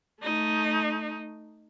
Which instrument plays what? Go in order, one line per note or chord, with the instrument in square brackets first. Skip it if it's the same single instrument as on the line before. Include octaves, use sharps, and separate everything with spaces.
[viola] A3 D#4